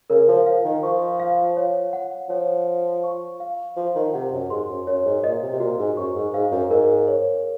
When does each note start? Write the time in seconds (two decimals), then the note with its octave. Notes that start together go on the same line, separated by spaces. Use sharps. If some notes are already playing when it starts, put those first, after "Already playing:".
0.10 C#3 A#4
0.28 F3
0.46 F5
0.65 D#3
0.83 F3 C#6
1.20 F5
1.57 C#5
1.93 F#5
2.30 F3 C#5
2.67 F5
3.04 C#6
3.40 F5
3.77 F3 C5
3.95 D#3
4.14 C3 F#5
4.32 F#2
4.50 G#2 C6
4.69 F#2
4.87 F#2 C#5
5.05 G#2
5.24 A#2 D#5
5.42 C3
5.53 C3
5.60 A#2 F#4
5.78 G#2
5.97 F#2 C#6
6.15 G#2
6.33 G#2 F5
6.52 F#2
6.70 G#2 A#4
7.08 C#5